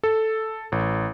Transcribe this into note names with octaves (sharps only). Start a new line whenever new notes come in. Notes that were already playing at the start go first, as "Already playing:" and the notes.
A4
A1